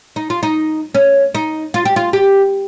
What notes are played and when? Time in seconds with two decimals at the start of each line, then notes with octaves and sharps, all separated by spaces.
0.16 D#4
0.30 F4
0.43 D#4
0.94 C#4
1.35 D#4
1.74 F4
1.85 G4
1.96 F4
2.13 G4